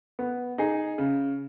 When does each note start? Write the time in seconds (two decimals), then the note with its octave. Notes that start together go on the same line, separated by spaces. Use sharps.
0.19 B3
0.58 D#4 G#4
0.98 C#3